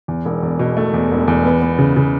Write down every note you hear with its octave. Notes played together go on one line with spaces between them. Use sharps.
E2
E1
E2
B2
A3
E2
E1
E2
B3
B3
C#3
C#3